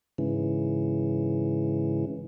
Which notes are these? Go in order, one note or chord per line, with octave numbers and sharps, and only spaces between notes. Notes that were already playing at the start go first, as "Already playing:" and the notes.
G#2 C#3 E3